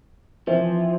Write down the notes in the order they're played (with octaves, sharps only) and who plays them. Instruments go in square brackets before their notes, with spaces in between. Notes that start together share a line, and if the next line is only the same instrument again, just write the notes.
[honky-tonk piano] E3 C4 E4 [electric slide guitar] F3